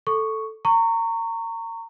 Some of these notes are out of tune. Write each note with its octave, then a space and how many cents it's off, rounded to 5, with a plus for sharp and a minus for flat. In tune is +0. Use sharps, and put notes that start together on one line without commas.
A4 +0 C#6 +0
A#5 -25 C#6 +0